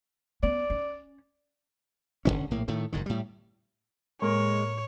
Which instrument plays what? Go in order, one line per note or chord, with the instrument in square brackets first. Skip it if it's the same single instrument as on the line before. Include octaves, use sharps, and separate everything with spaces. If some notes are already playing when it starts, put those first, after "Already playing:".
[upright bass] B3 C#4 [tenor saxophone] D5
[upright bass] C#4
[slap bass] D1 D#2 D3 C#4
A#1 A2 A#3
A2 D#3 A3
F#1 G#2 D#3
A2 G3
[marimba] A2 [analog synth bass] G#3 [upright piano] A#3 A#4 [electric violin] C#5